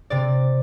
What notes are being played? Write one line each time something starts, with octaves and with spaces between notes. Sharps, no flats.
C3 D5